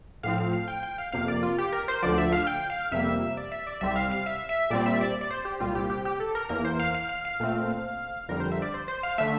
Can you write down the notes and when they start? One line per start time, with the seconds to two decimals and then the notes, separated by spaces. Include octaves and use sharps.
0.23 A2 F3 C4 F5
0.38 F5
0.53 F5
0.68 G5
0.83 G5
0.98 F5
1.12 F2 C3 F3 A#3 F5
1.28 D5
1.43 F4
1.58 G4
1.72 A#4
1.88 C5
2.02 D2 D3 F3 D5
2.18 E5
2.32 F5
2.47 G5
2.70 F5
2.92 F2 C3 G3 A#3 E5
3.37 D5
3.52 E5
3.67 D5
3.81 C2 C3 G3 C4 E5
3.96 F5
4.11 F5
4.26 E5
4.49 E5
4.70 A#2 G3 C4 D5
4.86 E5
5.01 D5
5.21 D5
5.30 C5
5.45 G4
5.60 C2 A#2 G3 C4 F4
5.75 G4
5.90 G4
6.05 G4
6.20 A4
6.35 A#4
6.49 E2 E3 A#3 A#4
6.65 C5
6.79 F5
6.94 F5
7.09 F5
7.25 F5
7.40 A#2 A3 C4
8.29 F2 D3 G3 A#4
8.40 C5
8.52 E5
8.62 D5
8.74 C5
8.88 C5
9.03 F5
9.18 D3 A3 E5